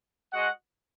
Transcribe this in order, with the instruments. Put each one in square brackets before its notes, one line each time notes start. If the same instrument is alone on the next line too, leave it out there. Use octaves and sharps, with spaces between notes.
[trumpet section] G#3 F#4 D#5 F#5